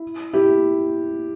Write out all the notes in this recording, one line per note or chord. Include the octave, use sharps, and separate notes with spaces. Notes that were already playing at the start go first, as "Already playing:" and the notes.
Already playing: E4
E4 G4